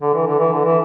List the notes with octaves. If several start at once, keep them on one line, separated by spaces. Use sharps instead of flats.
D3
E3
D3
E3
D3
E3